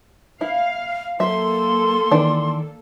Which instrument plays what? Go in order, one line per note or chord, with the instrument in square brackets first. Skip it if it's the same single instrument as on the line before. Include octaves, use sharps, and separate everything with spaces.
[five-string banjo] E4 [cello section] F5
[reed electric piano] F#3 [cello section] A#3 A4 [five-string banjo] E5 [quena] C6
[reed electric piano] D#3 E3 [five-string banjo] D4